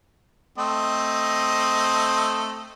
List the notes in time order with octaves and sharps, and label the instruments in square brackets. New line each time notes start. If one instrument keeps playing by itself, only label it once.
[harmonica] A3 C4 D#5